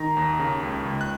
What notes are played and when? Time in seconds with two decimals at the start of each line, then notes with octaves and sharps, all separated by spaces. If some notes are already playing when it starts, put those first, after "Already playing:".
Already playing: D#3 A#5
0.17 D#2
0.39 C#3
0.63 C#2
0.86 C#2
1.01 F#6